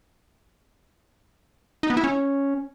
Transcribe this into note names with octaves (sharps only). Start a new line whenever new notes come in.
D#4
B3
E4
C#4